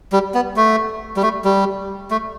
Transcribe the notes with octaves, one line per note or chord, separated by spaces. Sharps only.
G3
B3
A3
G3
A3
G3
A3